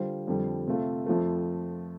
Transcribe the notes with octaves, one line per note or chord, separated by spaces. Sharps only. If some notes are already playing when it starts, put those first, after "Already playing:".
Already playing: D3 G3 F4 C5
F2 D3 G3
C3 A3 F4
F2 F3 A3